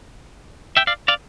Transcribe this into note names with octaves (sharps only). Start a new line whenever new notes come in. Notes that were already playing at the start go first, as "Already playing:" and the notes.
E5 G5
D5 F5
D5 F5